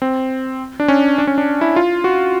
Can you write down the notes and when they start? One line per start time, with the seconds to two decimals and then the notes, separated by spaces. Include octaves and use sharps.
0.02 C4
0.80 D4
0.88 C#4
1.18 D4
1.27 C#4
1.38 D4
1.61 E4
1.76 F4
2.04 F#4